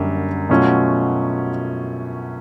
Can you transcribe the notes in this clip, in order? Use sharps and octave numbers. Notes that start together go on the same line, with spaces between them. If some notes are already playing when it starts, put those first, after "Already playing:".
Already playing: F#2 D3 G3 A#3
B2 F#3 A3 C#4 F4